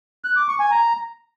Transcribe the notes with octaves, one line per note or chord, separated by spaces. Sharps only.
F#6
D6
C#6
G#5
A#5